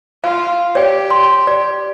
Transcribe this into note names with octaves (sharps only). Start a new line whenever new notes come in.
F4 F5
G4 C#5 D5 G5
C6
D5